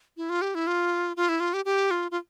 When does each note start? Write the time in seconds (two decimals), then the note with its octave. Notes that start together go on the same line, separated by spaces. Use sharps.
0.17 E4
0.29 F4
0.41 G4
0.55 E4
0.67 F4
1.17 F4
1.29 E4
1.40 F4
1.53 G4
1.65 G4
1.91 F4
2.11 F4